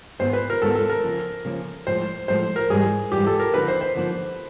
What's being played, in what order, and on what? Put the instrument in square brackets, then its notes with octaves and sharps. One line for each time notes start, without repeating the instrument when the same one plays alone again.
[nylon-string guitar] G#2 D#3 G#3 B3 [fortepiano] C5
[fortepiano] B4
A#4
[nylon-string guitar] G#2 D#3 G#3 B3 [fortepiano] A4
[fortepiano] A4
A#4
[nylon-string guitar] C#3 F3 A#3
C#3 F3 A#3
[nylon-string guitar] A2 F3 G#3 [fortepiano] C5
[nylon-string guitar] A2 F3 G#3 [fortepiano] C5
[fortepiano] A#4
[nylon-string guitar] G#2 E3 G3 [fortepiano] G#4
[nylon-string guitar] G#2 E3 G3 [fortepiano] G4
[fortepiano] A4
A#4
[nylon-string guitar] D3 F3 A#3 D#4 [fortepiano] B4
[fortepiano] C5
C5
[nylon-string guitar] D3 F3 A#3 D#4